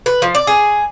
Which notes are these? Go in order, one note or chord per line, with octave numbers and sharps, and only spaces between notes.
B4
F3
D5
G#4